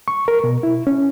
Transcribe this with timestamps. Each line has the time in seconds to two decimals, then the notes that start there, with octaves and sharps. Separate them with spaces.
0.08 C#6
0.28 A#4
0.44 B2
0.63 E4
0.87 C#4